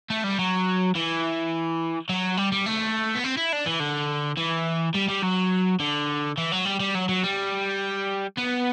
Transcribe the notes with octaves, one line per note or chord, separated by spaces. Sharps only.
A3
G3
F#3
E3
F#3
G3
G3
A3
B3
C4
E4
D4
E3
D3
E3
G3
G3
F#3
D3
E3
F#3
G3
G3
F#3
F#3
G3
B3